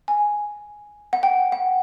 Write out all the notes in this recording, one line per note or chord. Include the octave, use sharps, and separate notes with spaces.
G#5
F#5
G5
F#5